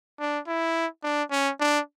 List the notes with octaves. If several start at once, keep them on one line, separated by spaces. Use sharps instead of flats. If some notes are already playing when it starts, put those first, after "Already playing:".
D4
E4
D4
C#4
D4